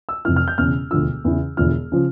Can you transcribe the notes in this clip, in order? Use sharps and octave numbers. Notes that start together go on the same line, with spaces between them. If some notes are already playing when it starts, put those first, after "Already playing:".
E6
F1 F2 E3 F6
F6
G6
E1 E2 C#3 F6
E1 D2 D3 F3 E6
E2 C#3 E3
E1 E2 D3 F3 F6
C#3 F3